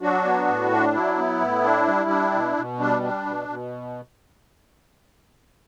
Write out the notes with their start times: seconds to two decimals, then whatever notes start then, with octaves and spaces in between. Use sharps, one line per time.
0.01 F#3 D4 F#4
0.24 B3
0.48 A2
0.71 D4
0.94 F#3 E4
1.17 B3
1.41 A2
1.64 D4
1.87 G3
2.10 D4
2.33 B2
2.57 B2
2.80 G3 D4
3.03 D4
3.26 B2
3.49 B2